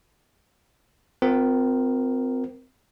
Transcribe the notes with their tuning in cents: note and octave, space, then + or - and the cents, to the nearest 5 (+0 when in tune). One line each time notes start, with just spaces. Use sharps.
C4 -25 F4 +25 A#4 +0